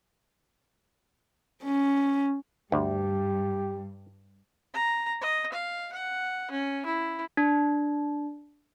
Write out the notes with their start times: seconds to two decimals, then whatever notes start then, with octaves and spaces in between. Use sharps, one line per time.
1.63 C#4
2.72 D2 G2 G3 G4
4.74 A#5
5.22 D#5
5.53 F5
5.93 F#5
6.51 C#4
6.86 E4
7.37 D4